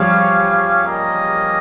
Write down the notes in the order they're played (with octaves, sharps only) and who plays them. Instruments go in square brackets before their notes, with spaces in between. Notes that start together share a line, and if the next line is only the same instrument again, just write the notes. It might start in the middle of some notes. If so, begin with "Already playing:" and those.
Already playing: [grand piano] F3 G3 [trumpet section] C#4 G4 C#5 F5
[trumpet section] A#3 C#4 G4 A#4 D#5